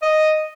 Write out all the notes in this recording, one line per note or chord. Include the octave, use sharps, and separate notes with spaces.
D#5